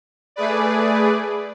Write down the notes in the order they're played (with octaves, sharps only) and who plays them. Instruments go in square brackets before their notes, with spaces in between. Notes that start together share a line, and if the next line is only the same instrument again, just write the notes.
[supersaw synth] A3 G#4 B4 D5